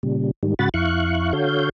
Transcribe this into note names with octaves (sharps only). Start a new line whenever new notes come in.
A#2 C#3 G3
G#2 D#3 G3
G#2 C#3 F#4 F#5 B5 A6
F2 E4 F5 C#6 F#6
D3 F#4 A4 C#5 F5 G6